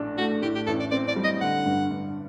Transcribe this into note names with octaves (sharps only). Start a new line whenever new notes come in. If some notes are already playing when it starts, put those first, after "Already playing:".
Already playing: A#1 A2 D4
A3 F#4
A2 G4
G4
A1 A4
D5
C4 D5
D5
G3
D#5
D3 F#5
G2
G2